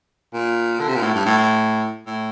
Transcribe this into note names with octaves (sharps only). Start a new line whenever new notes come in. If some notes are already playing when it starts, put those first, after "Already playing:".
A#2
D3
C3
A#2
A2
G2
A2
A2
A2